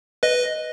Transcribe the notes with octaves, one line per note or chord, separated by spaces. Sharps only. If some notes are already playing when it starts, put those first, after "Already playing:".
B4 D#5